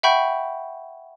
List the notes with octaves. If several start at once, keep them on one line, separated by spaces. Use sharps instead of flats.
E5 F#5 G5 B5 C#6 G6